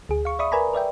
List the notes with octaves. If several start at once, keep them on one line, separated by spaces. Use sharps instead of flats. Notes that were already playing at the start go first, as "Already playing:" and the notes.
D2 G#4
F5 C#6
D5 E5 B5 C#6 D#6
A#4 B4 D5 G#5 A#5 B5
B4 D5 E5 G5